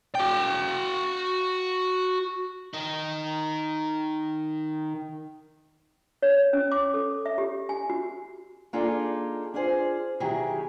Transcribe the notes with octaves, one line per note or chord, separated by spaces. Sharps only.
F#4 G5
D#3 D#4
C#5
C#4
D6
A4
E5
G4
G#5
F#4
A#3 D4 D#4 F4 G#4 A4
D4 F4 G#4 C5
B2 D#3 F#3 E4 G4 G#4